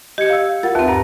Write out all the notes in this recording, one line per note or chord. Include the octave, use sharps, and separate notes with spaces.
G4 D#5 G#6 C#7
F5 E6
F4 A#4 F#5 A6
D#2 C4 B4 E5 A5
G2 A#5